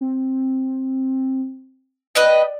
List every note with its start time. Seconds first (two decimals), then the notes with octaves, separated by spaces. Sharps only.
0.01 C4
2.15 B4 D5 D#5 G5